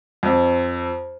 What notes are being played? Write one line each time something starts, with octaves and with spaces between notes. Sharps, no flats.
F2